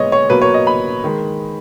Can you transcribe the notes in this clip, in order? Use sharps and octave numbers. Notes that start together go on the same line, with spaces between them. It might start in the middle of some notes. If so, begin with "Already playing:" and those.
Already playing: A#2 G#3 B3 C#5 D#5
C#5
B2 F#3 A#3 B4
C#5
D#5
B5
D#3 G#3